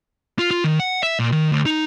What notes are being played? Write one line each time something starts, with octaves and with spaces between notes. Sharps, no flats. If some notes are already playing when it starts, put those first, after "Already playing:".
F4
F4
D#3
F#5
E5
A#2
D#3
D2
D#4